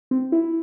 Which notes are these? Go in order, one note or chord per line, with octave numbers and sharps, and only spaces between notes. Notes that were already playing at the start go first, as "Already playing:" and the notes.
C4
E4